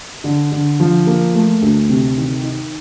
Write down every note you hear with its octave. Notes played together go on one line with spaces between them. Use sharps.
D3
D3
F3
A#3
A3
D2
C3
D#3
D#4